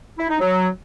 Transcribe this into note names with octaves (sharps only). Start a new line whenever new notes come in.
E4
D#4
F#3